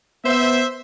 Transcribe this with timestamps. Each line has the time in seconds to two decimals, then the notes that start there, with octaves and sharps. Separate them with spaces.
0.25 B3 C5 E5